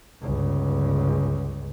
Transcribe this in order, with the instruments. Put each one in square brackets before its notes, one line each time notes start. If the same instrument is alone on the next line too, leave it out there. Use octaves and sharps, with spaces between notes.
[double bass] G1 C#2